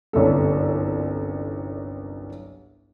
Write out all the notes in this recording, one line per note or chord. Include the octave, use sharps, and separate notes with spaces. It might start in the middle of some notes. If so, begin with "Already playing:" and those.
G1 C2 F#2 A4